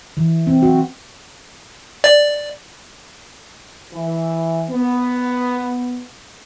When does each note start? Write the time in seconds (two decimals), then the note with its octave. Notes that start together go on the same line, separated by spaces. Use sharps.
0.17 E3
0.47 C4
0.62 F#4
2.04 D5
3.93 E3
4.70 B3